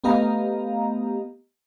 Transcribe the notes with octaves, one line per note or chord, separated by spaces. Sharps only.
A3 B3 G4 D#5 F5 A#5